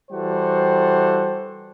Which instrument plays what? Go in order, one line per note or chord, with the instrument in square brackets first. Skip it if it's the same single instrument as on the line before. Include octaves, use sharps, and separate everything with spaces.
[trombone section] E3 G3 F#4 A4 C5